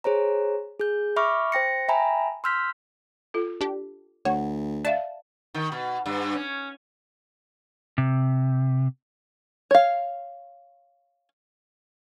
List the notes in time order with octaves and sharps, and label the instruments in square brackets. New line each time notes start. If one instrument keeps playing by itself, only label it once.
[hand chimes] G#4 C5 C#5 A#5
G#4 G6
E5 B5 C#6 D6 F6
C5 G5 A#6 C#7
E5 G5 G#5 A#5 B5
C6 E6 F6 G6 B6
[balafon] F4 A4
[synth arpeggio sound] D4 G4
[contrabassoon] D2 [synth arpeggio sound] C#5 [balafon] F#5
[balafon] D5 E5 F5 [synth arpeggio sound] A5
[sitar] D#3
B2
G2
C#4
[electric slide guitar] C3
[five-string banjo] C#5 F5